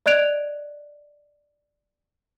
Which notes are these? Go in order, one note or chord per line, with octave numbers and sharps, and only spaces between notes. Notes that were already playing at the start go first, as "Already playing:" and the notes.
D5 D#5 F#6 G#6 D7 F7